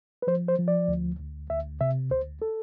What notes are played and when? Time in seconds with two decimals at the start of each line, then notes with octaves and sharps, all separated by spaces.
0.22 B4
0.27 F3 C5
0.48 C5
0.58 F3
0.68 D5
0.88 D2
1.19 D2
1.50 D2 E5
1.81 C3 E5
2.11 D2 C5
2.42 A4